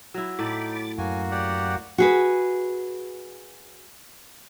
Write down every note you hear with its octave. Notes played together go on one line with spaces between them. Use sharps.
F#3 E4
A2 D#4 B5 D6 A6
F#2 A#3 F#4 G#5
G4 D5 F#5
F#4 G#4 B4